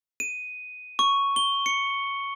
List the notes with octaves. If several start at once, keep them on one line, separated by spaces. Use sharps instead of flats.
D#7
C#6
G7
C#7